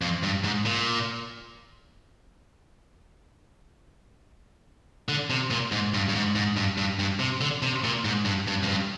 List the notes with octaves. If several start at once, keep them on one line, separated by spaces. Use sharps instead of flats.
F2
G2
G#2
A#2
D3
C3
A#2
G#2
G2
G2
G#2
G#2
G2
G2
G2
C3
D3
C3
A#2
G#2
G2
G2
F2
G2